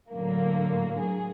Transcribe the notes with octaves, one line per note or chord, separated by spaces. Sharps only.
A2 D3 F#3 A#3
F#3 G#4